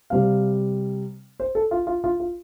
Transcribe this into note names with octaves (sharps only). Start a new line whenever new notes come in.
C3 G3 C4 F5
C5
A4
F4
F4
F4
F4